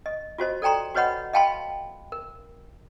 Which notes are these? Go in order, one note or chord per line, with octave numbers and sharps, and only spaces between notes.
D#5
F4 F#4 C5 D#5
A4 D5 G5 A#5 C6
F#4 B4 C#5 D#5 F#5 B5
D#5 F5 G5 A5 B5 C6
A#4